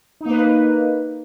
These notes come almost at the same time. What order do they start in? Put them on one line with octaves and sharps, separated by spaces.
D#4 A#3 B4